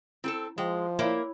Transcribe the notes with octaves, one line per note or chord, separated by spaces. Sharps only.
C4 E4 G#4 A4
F3 G#3 D#5 G5 C#6
A#3 E4 C#5 D5